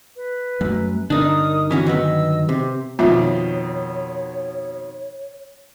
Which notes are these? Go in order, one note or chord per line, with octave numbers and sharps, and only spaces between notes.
B4
F#2 G3 A3
G2 D3 D4 D#4 A#4 D#6
E3 C#4 F#4
D#3 F#3 B3 D#5 E6
C3 G4
F2 B2 D#3 F4 C#5 E5